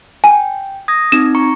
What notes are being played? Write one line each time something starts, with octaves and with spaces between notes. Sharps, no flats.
G5 G#5
D#6 G#6 A#6
C4 D#4 G#6 E7
A#5 C#6 C#7